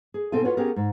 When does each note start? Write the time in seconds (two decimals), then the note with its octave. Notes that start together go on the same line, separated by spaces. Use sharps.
0.14 G#4
0.32 B2 C4 D#4 A4 F5 G#5
0.44 F4 F#4 B4 C#5
0.57 B3 C#4 G4 G#4 A#4
0.76 G#2